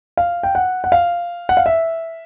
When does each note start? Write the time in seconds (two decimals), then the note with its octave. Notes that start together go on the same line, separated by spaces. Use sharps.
0.17 F5
0.43 G5
0.55 F#5
0.84 F#5
0.92 F5
1.49 F#5
1.57 F5
1.66 E5